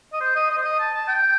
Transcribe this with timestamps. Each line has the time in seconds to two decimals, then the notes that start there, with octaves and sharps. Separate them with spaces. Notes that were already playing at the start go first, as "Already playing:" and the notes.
0.13 D#5
0.21 C5
0.36 D#5
0.50 D#5
0.57 C5
0.65 D#5
0.79 A5
0.94 A5
1.08 G5